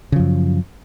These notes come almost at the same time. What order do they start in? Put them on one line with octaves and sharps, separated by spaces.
C#3 F3 F#2